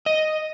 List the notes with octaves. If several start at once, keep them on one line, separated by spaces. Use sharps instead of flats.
D#5